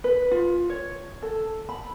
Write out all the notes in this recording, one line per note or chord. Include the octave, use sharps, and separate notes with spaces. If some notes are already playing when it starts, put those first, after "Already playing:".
B4
F4
C#5
A4
B5